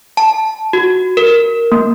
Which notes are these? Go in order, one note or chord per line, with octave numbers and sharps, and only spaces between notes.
A5
F#4
A#4
A#3